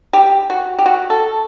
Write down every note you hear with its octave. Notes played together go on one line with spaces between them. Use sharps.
G4
F#4
G4
F#4
A4